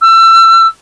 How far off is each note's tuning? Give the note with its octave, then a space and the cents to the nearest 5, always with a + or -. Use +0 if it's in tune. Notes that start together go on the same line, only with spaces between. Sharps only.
E6 +30